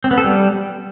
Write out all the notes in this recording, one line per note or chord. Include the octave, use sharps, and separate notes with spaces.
C4
B3
A4
G3